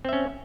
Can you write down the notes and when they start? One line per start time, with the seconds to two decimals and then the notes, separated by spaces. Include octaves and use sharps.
0.05 C4
0.09 E5
0.13 C#4